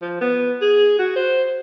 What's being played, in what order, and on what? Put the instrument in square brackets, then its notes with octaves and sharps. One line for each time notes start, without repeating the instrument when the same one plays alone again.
[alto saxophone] F3
B3
G#4
F#4
C5